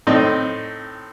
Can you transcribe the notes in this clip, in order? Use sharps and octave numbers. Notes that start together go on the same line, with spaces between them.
A2 C4 D#4